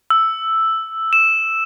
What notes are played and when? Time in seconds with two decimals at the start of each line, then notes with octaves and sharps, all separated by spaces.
0.10 E6
1.13 E7